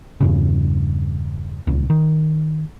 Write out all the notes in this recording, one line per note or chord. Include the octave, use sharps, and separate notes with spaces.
E2 G2 C#3
D#1 C#2
D#3